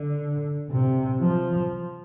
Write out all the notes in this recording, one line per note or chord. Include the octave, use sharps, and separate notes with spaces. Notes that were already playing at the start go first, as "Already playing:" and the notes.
Already playing: D3
C3
F3